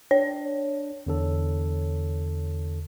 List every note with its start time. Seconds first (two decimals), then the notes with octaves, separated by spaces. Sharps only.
0.11 D4 C#5
1.07 E2 D3 A4